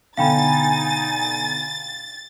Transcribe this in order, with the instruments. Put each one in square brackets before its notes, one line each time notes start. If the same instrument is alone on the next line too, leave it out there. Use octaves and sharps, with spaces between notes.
[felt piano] B2 D3 [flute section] D#4 G#5 [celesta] F5 G5 B5 [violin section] A6